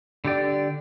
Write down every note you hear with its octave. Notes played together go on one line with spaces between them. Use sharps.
D3 G4 D5